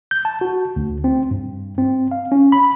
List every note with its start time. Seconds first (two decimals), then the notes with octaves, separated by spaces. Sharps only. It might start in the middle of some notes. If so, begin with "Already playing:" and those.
0.11 G6
0.25 A5
0.41 F#4
0.76 D2
1.04 C4
1.31 G2
1.78 C4
2.11 F5
2.32 C#4
2.52 B5